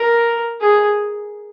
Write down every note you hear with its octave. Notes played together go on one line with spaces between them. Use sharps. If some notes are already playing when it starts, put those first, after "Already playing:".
Already playing: A#4
G#4